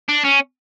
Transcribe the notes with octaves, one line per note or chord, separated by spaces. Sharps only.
D4
C#4